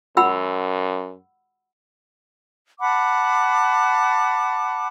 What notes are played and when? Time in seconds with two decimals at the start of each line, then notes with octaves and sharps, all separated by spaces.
0.17 F#2 F#5 B5 E6
2.80 F#5 A5 B5 D6